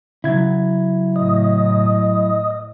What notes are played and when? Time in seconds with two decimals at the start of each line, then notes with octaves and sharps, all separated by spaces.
0.24 C#3 F#3 E4 G#6
1.16 A2 D#5